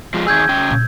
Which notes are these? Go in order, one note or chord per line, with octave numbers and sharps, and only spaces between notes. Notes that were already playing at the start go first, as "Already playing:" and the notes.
F3 G#3
D#3 G#4 E6 G6 G#6
C#3 G5
A#2